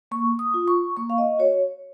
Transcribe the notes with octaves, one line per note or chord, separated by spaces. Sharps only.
A#3 C#6
D#6
F4
C#6
A#3 C#6
F5
D#5
F#4 C#5